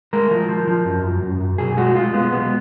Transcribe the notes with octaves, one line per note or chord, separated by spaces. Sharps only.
G#3 A#4
F3
F3
F3
F#2
F#2
F#2
F#2
B1 G#4
G#3 F#4
G#3 F4
G#3 B3
B1 B3